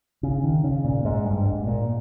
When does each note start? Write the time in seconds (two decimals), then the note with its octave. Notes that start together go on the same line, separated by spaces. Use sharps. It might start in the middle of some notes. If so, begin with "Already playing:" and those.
0.23 C#3
0.44 D#3
0.64 C#3
0.84 A#2
1.05 G#2
1.25 G2
1.45 G#2
1.67 A#2